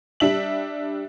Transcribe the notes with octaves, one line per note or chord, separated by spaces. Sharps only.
G3 D4 E5 F#7